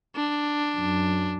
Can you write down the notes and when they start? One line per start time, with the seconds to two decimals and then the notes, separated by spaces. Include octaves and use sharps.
0.16 D4
0.76 F#2